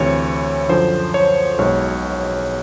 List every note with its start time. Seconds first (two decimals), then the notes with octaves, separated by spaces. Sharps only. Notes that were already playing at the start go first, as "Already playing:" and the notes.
Already playing: D2 C3 E3 C#5
0.69 F#2 D3 F3 C5
1.14 C#5
1.58 B1 B2 G#3 C#5